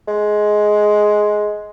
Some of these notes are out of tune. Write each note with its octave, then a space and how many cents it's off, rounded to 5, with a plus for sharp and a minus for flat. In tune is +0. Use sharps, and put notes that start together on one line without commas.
G#3 +10